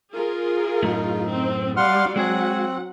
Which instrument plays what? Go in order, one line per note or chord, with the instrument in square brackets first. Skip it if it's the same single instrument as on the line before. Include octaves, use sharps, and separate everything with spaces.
[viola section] F4 G#4 A#4
[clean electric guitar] F#2 A2 A3 [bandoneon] D#4
[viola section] C4
[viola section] G3 D5 F5 [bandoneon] F#5 C6 F6
[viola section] F#3 F#5 [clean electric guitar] G#3 F#4 G#4 [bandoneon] C4